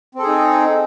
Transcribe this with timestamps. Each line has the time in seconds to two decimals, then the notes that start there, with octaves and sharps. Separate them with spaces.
0.15 C4
0.19 A4
0.23 G#4
0.27 D#4